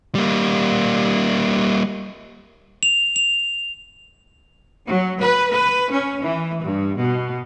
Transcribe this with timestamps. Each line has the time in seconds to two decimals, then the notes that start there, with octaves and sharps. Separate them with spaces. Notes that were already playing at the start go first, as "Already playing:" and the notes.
0.15 G3 A#3
2.83 F7
3.16 F7
4.87 F#3
5.19 B4
5.52 B4
5.92 C#4
6.23 E3
6.63 G2
6.98 B2